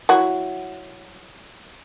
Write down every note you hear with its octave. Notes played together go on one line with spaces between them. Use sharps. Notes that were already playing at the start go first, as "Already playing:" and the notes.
F#3 E4 F#4